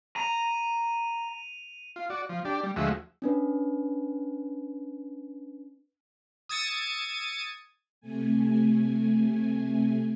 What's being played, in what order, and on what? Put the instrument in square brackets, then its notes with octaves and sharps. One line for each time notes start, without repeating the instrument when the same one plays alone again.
[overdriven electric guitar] A#5 [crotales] D#7 F7
[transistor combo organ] F4
F#4 D5
F3
D4 G4
G3
D2 F3 G#3 F#4 E5
[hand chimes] C#4 D4 B4
[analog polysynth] D#6 E6 G#6 A6 C#7 D#7
[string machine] C3 A3 G#5